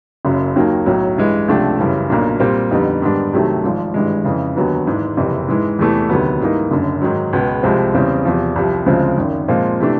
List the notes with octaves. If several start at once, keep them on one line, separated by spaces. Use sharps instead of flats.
F#1 F#2 C#3 F#3
D#2 D#3 F#3 A#3
B1 A2 F#3
G2 E3 G#3
C#2 C3 F3 A3 D4
F#2 C#3 E3 G3
B1 A#2 F#3 A#3 D4
A#2 G3 C4
F2 D3 G3 B3 D#4
G#2 D#3 G3 B3 D4
C2 C3 D#3 F#3 A3
G#1 G#2 F3
G#1 G2 E3 G#3
F2 C#3 E3
D#2 D3 F#3 B3 D#4
G#1 G#2 E3 G#3
F#1 F2 C3 E3
G#2 E3 G#3
E2 C3 E3 A3
D2 C3 D#3 F#3 B3
G#2 E3 G3 A#3 D#4
F#1 F#2 D3
G#2 D#3 F#3
C#2 B2 G#3 B3
C2 C3 F3 G#3 C4
E2 C#3 E3 G3 C4
E2 C3 F3
C2 C3 F3
D2 C#3 F3 G#3 C4
G#1 F#2 D#3
A#2 F3 G#3 C4 F4
C3 E3 A3 D4